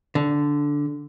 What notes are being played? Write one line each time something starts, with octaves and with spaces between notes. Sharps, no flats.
D3